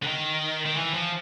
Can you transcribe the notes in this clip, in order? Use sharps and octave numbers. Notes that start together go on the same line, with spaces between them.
D3
D#3
D#3
E3
F3